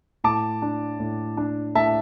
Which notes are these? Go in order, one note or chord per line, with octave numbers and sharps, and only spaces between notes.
A2 A5 D6
D4
A2
D4
A2 E5 A5